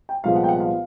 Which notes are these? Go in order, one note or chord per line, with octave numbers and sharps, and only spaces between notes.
G5
C2 A#2 F3 G#3 B3 F5
F#5
G5
F#5
F5